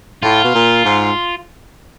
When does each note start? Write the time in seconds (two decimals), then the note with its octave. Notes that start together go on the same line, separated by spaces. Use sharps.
0.23 A2 F4
0.44 B2
0.54 A#2
0.85 G#2